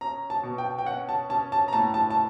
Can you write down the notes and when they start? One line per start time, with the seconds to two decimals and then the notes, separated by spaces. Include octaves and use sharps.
0.01 C#4 A#5
0.30 A5
0.43 B2
0.58 G5
0.79 G5
0.86 C#4 F#5
1.09 A5
1.29 C#4 A5
1.52 A5
1.68 A#5
1.73 A2 A5
1.94 A5
2.10 A5